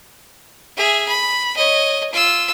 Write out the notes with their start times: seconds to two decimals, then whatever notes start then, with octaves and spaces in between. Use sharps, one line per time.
0.77 G#4 E5
1.08 B5
1.57 C#5 D#5
2.12 F4 E6